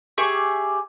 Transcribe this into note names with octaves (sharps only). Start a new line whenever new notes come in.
G4 G#4 E5 C#6